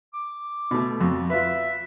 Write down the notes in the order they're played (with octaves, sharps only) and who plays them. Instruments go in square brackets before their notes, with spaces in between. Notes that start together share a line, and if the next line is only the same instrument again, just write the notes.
[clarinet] D6
[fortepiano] B2 A3
[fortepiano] F2 [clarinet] F#4
[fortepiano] F4 B4 [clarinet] E5